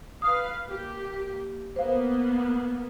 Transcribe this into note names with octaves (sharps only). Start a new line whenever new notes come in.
B4 F5 D#6
A#3 G4
A#3 B3 C5 F5